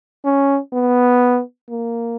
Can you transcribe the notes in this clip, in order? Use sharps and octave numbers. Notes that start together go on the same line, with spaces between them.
C#4
B3
A#3